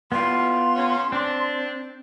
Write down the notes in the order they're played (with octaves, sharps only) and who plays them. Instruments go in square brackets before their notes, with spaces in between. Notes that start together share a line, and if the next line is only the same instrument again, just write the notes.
[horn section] A2 G3 [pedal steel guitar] B3 F4 [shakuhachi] C6
[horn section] C#3 C#4
[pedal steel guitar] C4 [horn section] D4